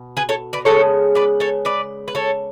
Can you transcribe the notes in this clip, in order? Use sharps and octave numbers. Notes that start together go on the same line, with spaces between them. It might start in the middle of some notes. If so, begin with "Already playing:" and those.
Already playing: B2
G#4 B4
A4 C#5
B4 D5
C#3 G#3 B3 A4 C#5
B4 D5
A4 C#5
B4 D5
B4
A4 C#5